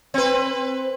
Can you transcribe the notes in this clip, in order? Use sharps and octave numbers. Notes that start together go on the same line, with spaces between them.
C4 B4